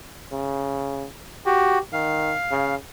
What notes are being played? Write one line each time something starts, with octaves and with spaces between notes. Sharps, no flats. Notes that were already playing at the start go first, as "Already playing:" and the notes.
C#3
F#4 G4
D#3 F5
C#3